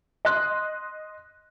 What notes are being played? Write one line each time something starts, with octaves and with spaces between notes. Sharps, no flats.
D#5 C6 F#6